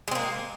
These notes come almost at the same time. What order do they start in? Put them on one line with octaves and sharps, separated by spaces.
G#3 C4 A#3